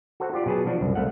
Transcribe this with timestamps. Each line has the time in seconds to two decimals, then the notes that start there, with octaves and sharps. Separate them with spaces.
0.20 F#4 A4 C5 F#5
0.33 F4 G4 D5
0.46 B2 F#3 G#4 B4 A5
0.66 F3 D4 F#4
0.81 C2 F#2
0.95 C2 A3 F5 F#5